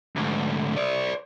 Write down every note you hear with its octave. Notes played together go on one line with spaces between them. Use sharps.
D2 G#2
C5 D5